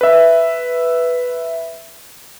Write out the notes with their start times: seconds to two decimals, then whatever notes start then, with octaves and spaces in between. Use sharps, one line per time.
0.01 B4 E5